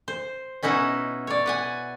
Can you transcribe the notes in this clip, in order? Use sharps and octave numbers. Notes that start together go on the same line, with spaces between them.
C5
B2 C#4 D#4 E4 F#5
C#5 D5
B4 F#5 G#5